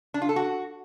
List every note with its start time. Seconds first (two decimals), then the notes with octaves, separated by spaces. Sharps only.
0.14 D4
0.22 F4
0.29 A4
0.36 F#4